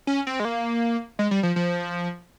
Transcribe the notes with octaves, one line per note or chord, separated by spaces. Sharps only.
C#4
C4
G#3
A#3
G#3
G3
F3
F3